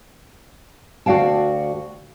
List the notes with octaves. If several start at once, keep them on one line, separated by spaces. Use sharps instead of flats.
D2 F#4 D5 F5 G5 A5